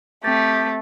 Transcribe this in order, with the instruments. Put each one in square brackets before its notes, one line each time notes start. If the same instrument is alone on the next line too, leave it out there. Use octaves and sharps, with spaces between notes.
[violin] A3 [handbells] C4 A6 [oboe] G4